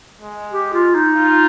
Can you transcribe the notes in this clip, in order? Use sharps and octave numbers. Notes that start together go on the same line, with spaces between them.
G#3
G4
F4
D#4
F4